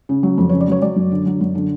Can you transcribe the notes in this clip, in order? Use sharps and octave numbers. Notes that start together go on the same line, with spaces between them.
C#3
F#3
F2
C#5
C#3
D5
F#3 C#5
F#3 D5
F#2
D3
F#3
F#2
D3